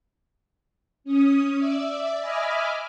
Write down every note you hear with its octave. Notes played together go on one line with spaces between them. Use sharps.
C#4 D#6
D5 E5
D#5 E5 G#5 B5 D6 F6